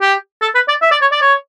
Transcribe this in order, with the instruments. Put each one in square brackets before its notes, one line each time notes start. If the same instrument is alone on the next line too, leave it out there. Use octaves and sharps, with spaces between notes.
[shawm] G4
A4
B4
D5
E5
D5
C#5
D5
C#5